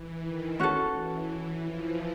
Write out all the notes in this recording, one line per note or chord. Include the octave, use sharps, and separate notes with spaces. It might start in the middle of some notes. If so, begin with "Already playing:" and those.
Already playing: E3
D#3
C#4 F#4 A4
E3
E3
F3